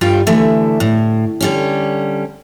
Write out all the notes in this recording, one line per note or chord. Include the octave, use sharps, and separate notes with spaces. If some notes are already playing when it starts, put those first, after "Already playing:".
G2 G3 F4 G5
D3 E3 A3 E5
A2
D3 G3 C#4